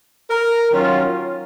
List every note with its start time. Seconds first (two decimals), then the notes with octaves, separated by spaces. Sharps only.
0.30 A#4
0.72 D#3 F#3 C#4 F4